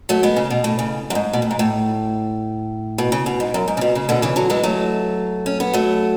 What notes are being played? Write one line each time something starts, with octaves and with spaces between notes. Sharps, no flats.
F#3 A3
G#3 B3
C#3
B2
A2
C#3
F#2
G#2
B2
A2
G#2
A2
B2
C#3
B2
G#2
F#2
G#2
C#3
B2
C#3
B2 D3
C#3 E3
D3 F#3
E3 G#3
F#3 A3
C#4
B3
F#3 A3